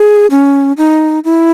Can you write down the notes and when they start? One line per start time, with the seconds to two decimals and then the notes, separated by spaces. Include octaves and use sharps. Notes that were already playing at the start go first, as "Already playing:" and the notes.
Already playing: G#4
0.31 C#4
0.77 D#4
1.24 E4